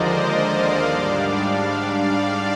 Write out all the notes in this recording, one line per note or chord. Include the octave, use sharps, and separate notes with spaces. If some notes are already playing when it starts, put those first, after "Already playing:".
Already playing: D#2 D3 F3 G#3 A#4 C5 D5 D#5
D5 F5
G#2 G3 D4
D5 F5